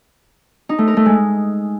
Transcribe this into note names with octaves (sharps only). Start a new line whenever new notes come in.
D#4
A3
A#4
A3
G#3